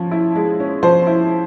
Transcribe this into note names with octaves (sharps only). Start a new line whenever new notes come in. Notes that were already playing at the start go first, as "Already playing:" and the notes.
Already playing: F3 C#4
E4
G#3
C#4
F3 C5
E4